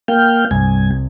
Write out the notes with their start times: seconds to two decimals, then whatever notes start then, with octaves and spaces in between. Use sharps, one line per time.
0.08 A#3 F5 G5
0.51 C2 G2 G#5